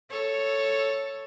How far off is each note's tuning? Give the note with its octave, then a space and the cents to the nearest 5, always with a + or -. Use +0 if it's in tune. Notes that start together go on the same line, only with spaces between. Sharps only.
A4 +0 C#5 +0